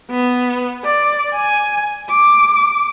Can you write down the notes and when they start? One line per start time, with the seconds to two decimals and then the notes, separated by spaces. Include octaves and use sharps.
0.11 B3
0.84 D5
1.34 G#5
2.10 D6